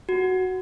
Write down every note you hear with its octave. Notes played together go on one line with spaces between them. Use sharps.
F#4